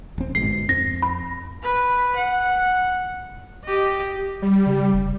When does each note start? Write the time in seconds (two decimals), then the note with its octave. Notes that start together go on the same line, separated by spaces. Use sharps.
0.18 D1 C4
0.35 G1 G#2 B2 C7
0.69 F2 C4 A#6
1.02 B5
1.63 B4
2.17 F#5
3.64 G4 D#5
4.42 G3
4.66 C#3
4.94 F1